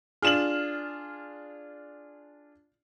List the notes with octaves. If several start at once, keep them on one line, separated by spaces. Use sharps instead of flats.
D4 F4 G#4 F6 E7 F#7